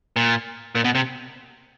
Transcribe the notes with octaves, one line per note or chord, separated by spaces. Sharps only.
A#2
A#2
B2
C3